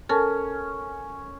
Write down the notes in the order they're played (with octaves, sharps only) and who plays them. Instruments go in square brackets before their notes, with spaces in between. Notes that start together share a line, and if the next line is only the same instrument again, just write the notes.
[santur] C#4 [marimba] A4 A#4 A5